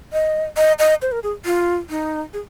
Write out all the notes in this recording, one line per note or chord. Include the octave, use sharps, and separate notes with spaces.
D#5
D#5
D#5
C5
A#4
G#4
F4
D#4
G#4